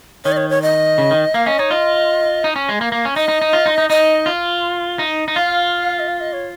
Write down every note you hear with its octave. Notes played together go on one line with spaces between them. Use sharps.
D#3 C#5
D#5
C#5
C#5
D#5
C#3
D#3
A#3 F5
C#4 D#5
D#4 C#5
F4 D#5
D#4
C#4
G#3
A#3
A#3
C#4
D#4 D#5
D#4
D#4
F4
D#4
D#4
D#4 D#5
F4
D#4
D#4
F4 F5
D#5
F5
D#5
C#5